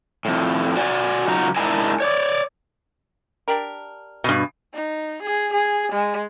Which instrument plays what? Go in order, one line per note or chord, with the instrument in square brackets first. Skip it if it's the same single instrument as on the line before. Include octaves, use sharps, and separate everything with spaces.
[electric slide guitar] F2 A2
F#4 D5 G#5
C#3 F#3 D#4 F4 F#4 A#5
G#2 D4 E4 A#4 D#5 G#5
C#5 D5
[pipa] D4 G4 A#4
[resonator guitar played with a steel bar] G2 B2
[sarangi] D#4
G#4
G#4
G#3